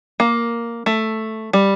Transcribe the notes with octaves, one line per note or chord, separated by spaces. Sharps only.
A#3
A3
G3